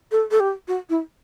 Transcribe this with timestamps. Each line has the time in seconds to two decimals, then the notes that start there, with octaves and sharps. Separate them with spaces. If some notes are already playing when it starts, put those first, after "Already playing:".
0.11 A4
0.31 A4
0.40 G4
0.68 F#4
0.90 E4